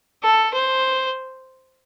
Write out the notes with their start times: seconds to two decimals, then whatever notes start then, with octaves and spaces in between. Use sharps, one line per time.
0.23 A4
0.54 C5